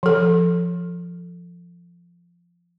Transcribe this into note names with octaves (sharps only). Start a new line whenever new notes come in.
F3 A4